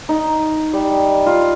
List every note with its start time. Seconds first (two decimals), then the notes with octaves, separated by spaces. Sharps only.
0.09 D#4
0.73 G3
1.26 F4